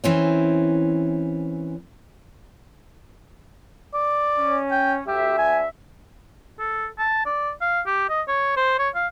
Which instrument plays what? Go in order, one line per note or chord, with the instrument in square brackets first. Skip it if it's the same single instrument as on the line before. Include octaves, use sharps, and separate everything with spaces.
[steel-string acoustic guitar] E3 C4 C#4
[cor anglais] D5
[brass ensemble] C#4
[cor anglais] G5
[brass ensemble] D2 E5 [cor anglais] G4
[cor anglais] G#5
[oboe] A4
A5
D5
F5
G4
D#5
C#5
C5
C#5
F5